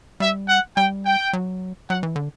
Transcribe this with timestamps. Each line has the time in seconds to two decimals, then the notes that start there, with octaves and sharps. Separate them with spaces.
0.20 G3 E5
0.49 F#5
0.77 G3 G5
1.05 G5
1.33 F#3
1.90 F#3 F#5
2.03 E3
2.16 D3